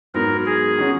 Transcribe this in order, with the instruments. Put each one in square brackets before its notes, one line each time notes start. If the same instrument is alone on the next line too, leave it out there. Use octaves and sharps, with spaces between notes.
[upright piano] G#2 F#3 B3 [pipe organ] A#4
[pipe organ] G#4
[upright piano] D#3 F#3 C#4 F#4